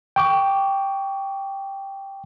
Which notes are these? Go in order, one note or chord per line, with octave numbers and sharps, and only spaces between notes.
G5 C#6 D6